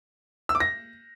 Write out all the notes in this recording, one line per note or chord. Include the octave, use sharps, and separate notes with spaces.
E6
D6
A#6